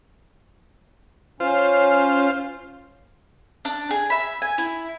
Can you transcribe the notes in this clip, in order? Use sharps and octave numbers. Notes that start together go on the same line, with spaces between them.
C#4 F4 C5
D4
G#4
E5 B5
G#5
E4